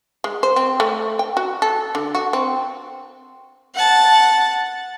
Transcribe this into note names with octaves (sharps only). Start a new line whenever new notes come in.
G#3
C5
C4
A3
G5
F#4
A4
D3
F#4
C4
F#5 A5